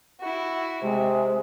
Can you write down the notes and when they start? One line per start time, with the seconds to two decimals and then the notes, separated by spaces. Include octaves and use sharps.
0.20 E4 F#4
0.82 C3 G#3 C4